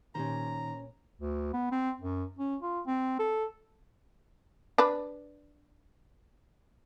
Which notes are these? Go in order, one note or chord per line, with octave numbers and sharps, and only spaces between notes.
A#2 D#3 C#4 G4 C5 A#5
D2
B3
C4
F#2
C#4
F4
C4
A4
D4 B4